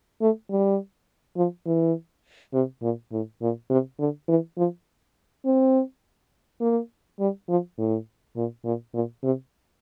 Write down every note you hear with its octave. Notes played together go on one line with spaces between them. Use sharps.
A3
G3
F3
E3
C3
A#2
A2
A#2
C3
D3
E3
F3
C4
A#3
G3
F3
A2
A#2
A#2
A#2
C3